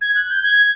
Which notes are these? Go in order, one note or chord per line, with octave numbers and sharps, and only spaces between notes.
G#6
F#6
G6
G#6